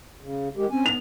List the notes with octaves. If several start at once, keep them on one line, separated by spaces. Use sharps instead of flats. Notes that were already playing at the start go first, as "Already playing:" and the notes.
C#3
D#3 G#3 G4
C4 C#4 G#5
B3 F7